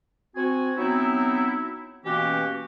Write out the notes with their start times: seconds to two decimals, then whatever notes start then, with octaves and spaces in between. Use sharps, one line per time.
0.36 C4 F#4 G#5
0.78 F#3 B3 C4 D#4 E4
2.06 B2 E3 A#3 C#4 F#4 G4